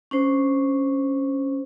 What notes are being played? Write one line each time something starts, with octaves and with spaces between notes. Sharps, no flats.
C#4 D4 C5